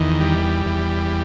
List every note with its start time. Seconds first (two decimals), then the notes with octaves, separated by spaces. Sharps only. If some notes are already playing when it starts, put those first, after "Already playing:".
Already playing: E2 D#3
0.20 G3
0.66 E2